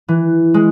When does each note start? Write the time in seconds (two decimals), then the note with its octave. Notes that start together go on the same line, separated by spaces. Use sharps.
0.08 E3
0.54 G#3